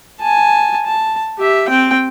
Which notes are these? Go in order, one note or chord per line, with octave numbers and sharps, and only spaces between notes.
G#5 A5
A5
G4 E5
C4 G5